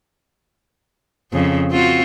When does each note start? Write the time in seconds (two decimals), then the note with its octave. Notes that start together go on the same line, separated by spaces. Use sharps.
1.32 F2 C#3
1.71 C4 F4 F#4